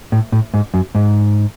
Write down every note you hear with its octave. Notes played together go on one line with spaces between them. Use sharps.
A2
A2
G#2
F#2
G#2